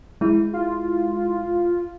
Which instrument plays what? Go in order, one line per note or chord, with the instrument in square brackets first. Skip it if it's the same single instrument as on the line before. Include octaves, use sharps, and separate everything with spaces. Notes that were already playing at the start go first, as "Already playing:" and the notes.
[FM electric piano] G#3 E4
[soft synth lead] F4